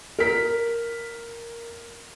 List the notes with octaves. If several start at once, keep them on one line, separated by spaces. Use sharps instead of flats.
A#4 B6